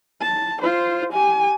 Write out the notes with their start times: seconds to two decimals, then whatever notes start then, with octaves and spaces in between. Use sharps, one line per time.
0.21 A5
0.61 F4 C5
1.13 G4 G#5